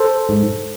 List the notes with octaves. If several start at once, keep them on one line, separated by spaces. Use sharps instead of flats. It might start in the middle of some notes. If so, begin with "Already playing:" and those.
Already playing: A4 C5
G#2